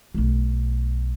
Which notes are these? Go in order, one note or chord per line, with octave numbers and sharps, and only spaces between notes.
B1 A3